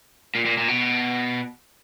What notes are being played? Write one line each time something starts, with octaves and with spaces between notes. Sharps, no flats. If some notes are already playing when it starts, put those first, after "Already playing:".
A#2
A#2
A#2
B2